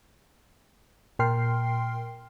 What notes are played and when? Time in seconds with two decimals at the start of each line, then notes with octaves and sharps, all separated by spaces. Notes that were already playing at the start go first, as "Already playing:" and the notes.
1.19 A#2 A#4 G5 C6 F6 C7